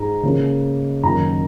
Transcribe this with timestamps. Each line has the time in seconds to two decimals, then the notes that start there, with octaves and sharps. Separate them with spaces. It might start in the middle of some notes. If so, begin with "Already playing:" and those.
Already playing: G#2 G#3 A#5
0.23 C#3 A#3
1.03 F#2 D#3 F#3 A#3 A#5